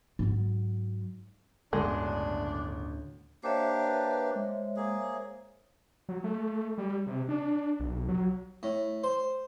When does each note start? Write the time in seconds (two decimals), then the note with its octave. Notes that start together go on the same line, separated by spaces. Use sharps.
0.19 G#2 F#3
1.73 G1 D2 A2 C#3 G#3 D4
3.44 A#3 D4 G4 C5 C#5 E5
3.87 B4
4.35 G#3
4.76 A#3 G#4
6.09 F#3
6.24 A3
6.78 G3
7.07 C3
7.29 D4
7.80 B1
8.08 F#3
8.63 A2
9.04 C5